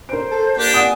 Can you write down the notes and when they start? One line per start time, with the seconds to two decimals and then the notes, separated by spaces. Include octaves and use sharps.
0.09 A#4 C5 D7
0.32 A4
0.57 A#3 D4 G4 G5
0.74 D5 F#5 G#5 D#6